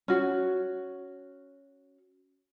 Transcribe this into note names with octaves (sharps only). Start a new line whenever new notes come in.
C#4 F#4